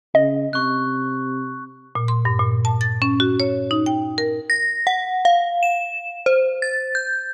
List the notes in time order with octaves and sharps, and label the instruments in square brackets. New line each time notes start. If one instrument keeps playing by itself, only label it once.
[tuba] C#3 [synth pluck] D#5
[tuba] C3 [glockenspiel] C#6 F#6
[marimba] A#2
C6
G2
A#2
A5
A6
C#4
F#4
C#5
D#4
G5
A#4
[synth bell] A#6
F#5
F5
E7
C5
A6
G6